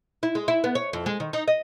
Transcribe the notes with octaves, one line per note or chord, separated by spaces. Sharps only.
E4
G#3
E4
B3
C#5
F2
G#3
D#3
D#4
D#5